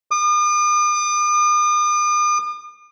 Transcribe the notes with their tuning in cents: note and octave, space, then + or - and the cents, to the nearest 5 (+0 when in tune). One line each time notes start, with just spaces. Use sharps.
D#6 -45